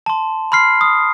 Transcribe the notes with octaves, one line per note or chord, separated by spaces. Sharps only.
A5 C6
B5 C6 F6 C7
D#6